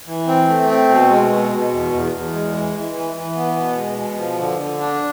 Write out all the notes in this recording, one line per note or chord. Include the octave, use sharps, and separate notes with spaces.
E3
C4
A3
C4
B2
G#3
B2
B2
E2
E2
E2
G#3
E3
E3
E3
E3
B3
B2
G#3
B2
F3
D3
D3
D4